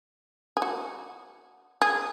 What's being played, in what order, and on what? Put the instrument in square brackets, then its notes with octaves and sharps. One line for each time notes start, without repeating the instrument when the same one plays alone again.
[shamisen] G#4
F#4
G#4